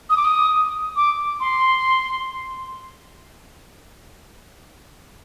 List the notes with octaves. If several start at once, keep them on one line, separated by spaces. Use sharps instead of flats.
D#6
D6
D#6
D6
C6